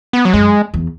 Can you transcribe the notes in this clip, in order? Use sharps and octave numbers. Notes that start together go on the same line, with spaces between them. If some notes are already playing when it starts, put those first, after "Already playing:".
B3
F#3
F#2 G#3
E2